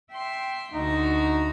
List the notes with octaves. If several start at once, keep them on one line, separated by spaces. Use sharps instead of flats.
E5 G5 C6
D2 D#4 F#4 A#5